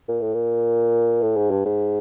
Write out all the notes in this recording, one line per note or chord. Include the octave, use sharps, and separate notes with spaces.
A#2
A2
A#2
A2
G#2
G2
G#2